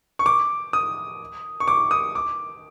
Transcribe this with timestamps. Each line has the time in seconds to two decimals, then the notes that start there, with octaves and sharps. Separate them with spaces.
0.19 C#6
0.26 D6
0.73 D#6
1.60 C#6
1.68 D6
1.91 D#6
2.15 D6